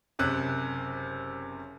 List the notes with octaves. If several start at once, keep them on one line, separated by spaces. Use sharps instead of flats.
F#1 C3 C#4 F#6